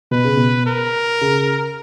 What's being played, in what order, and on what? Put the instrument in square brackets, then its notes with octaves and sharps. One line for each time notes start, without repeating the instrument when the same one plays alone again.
[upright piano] B2 [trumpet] B4
[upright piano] C#3
B2
[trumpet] A#4
[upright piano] C#3